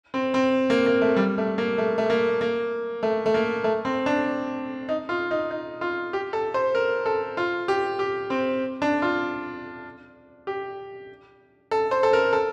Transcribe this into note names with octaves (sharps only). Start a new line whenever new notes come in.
C4
C4
A#3
A#3
A3
G3
A3
A#3
A3
A3
A#3
A#3
A3
A3
A#3
A3
C4
D4
D#4
F4
D#4
D#4
F4
G4
A4
C5
A#4
A4
F4
G4
G4
C4
D4
F4
G4
A4
C5
A4
A#4
A4